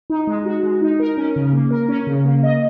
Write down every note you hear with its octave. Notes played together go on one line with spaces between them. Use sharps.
D#4
G#3
F#4
G#3
D#4
A#4
C#4
C#3
A#3
A#4
C#4
C#3
A#3
D#5